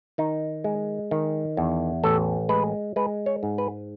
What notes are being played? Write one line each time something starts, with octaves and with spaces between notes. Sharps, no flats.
D#3 D#4
G#3
D#3
E2
A1 A4
G#3 B4
G#3 B4
C#5
G#2
B4